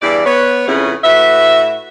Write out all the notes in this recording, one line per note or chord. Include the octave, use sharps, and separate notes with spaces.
E2 G2 E3 D5
B3 C#5
F2 C#3 B3 C#4 E4 G#4
A2 F#4 B4 E5